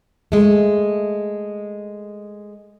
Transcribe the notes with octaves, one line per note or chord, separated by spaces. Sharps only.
G#3 A3